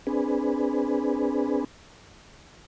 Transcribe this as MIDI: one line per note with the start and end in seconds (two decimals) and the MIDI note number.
0.07 1.64 60
0.07 1.64 62
0.07 1.64 68
0.07 1.64 71